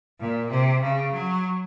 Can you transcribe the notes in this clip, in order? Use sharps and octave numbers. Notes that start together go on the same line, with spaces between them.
A#2
C3
C#3
F#3